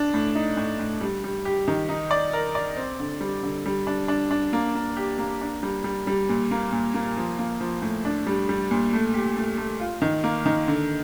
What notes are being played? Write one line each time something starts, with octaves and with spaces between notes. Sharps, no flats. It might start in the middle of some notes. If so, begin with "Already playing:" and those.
Already playing: D4
A2
D#4
A2
A2
G3
G3
G4
D#3
D#4
D5
A#4
D5
C4
D3
G3
D3
G3
D4
D4
D4
A#3
A#3
G4
A#3
D4
G3
G3
G3
A#2
A#3
A#2
A#3
F3
A#3
F3
A2
D4
G3
G3
A#2
A3
G4
A3
A3
F4
D#3
A#3
D#3
D3